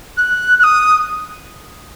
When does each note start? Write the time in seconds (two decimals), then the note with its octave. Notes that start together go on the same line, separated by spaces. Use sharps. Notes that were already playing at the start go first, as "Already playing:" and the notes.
0.17 F#6
0.59 F#6
0.64 D#6